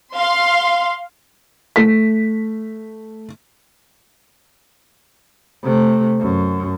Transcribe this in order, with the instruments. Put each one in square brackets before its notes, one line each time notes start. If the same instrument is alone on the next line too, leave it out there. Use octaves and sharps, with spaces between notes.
[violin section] F5 C6
[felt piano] A3 B6
[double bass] C3 A3
F#2